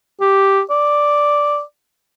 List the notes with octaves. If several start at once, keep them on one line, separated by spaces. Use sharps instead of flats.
G4
D5